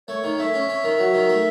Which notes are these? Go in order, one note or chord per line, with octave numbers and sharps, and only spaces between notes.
A3 C#5
D#3
A3 E5
C#4
C#4
D#3
F#3
D#3
A3